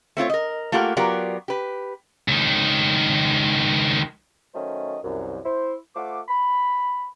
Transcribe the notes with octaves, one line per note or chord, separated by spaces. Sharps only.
A3 C4 F4 C#5
A#4 D#5
A3 A#3 F4 G4 A#4 F#5
F#3 B3 F4 G4 A#4 D5
G4 B4
C#2 D#3
D#3 F#3 A3 C#4 C5 D#5
C2 F#2
E4 C5
A3 F4 C5 F#5 D6
B5